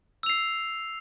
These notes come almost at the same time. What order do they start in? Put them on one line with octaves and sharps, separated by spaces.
E6 F7 C7